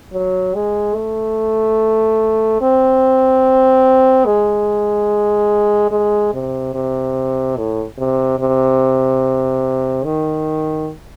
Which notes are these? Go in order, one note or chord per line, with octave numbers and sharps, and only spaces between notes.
F#3
G#3
A3
C4
G#3
G#3
C3
C3
A2
C3
C3
D#3